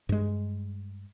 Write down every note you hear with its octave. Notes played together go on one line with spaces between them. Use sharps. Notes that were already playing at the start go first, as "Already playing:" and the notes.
G2 G#3